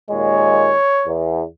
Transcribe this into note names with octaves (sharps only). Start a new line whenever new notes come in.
D#2 A#2 G#3 C#5
E2